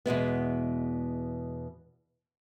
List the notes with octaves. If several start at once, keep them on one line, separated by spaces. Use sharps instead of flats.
E2 B2 G#3 B3